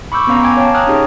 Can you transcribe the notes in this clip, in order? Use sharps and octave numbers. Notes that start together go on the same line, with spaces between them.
B5 C#6 D6 E6 G6
B3 C#4 F5 A#5
G5 G#5 D6 G#6
C#5 F5 G5 A5
G5 A#5 D#6 F6 F#6 G#6
C#4 D#4 G4 G#4 C#5